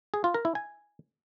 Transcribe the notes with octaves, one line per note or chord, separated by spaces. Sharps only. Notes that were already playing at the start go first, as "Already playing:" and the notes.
G#4
F4
A#4
E4
G#5